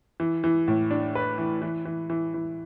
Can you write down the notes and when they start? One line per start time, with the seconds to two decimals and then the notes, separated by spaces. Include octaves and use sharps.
0.20 E3
0.44 E3
0.68 A2
0.91 D4
1.15 B4
1.38 E3
1.62 E3
1.85 E3
2.10 E3
2.34 E3